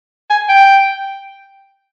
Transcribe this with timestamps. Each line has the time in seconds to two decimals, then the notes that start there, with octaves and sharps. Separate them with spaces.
0.30 G#5
0.49 G5